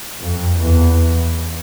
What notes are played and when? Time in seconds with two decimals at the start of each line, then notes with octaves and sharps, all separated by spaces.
0.19 F2
0.59 E2